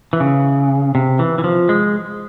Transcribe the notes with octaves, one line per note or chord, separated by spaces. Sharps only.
E3
C#3
C3
E3
E3
F3
G#3